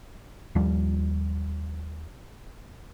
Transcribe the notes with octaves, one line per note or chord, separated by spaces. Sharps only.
D#2 F3 G3